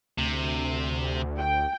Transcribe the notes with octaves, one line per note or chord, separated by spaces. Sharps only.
D2 C3
G5